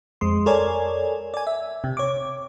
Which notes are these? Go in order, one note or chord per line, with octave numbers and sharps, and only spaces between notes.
F2 G#3 C6
A4 A#4 C#5 D5 G#5
D5 G#5
E5
C3
C#5 D6